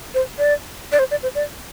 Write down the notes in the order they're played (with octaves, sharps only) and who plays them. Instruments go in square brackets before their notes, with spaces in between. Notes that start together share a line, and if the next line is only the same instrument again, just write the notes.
[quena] C5
D5
D5
C5
D5
C5
D5